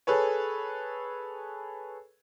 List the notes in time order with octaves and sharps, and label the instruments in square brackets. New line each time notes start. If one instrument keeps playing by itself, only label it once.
[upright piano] G#4 A4 B4 C#5